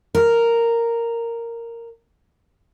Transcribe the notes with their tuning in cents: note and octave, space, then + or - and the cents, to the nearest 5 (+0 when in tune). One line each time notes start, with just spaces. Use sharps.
A#4 -5